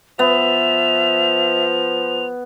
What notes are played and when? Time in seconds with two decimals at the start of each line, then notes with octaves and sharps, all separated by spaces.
0.19 F3 B3 E5 F7